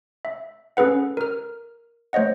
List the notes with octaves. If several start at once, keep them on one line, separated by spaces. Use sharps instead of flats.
E5
C#4 G#4 A4 B4 F#5
A#4 F6
A3 C5 C#5 D#5 F#5